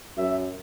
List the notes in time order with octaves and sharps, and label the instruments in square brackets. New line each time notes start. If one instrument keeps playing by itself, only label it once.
[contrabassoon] F#2 [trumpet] E5